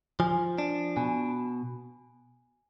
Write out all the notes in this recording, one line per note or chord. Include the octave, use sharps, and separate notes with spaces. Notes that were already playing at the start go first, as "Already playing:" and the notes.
F3 G#5
D4
B2 G#5